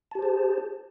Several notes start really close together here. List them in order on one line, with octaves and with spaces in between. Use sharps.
A5 G4 C5 G#4